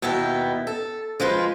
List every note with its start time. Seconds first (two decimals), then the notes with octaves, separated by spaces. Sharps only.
0.02 D#2 B2 B3 E4 G5
0.67 A4
1.20 F3 G#3 F4 B4